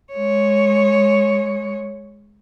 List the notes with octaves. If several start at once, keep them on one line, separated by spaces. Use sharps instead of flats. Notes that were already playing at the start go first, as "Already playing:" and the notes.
G#3 C#5